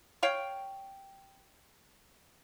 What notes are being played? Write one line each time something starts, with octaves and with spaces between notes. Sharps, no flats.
C#5 F5 G5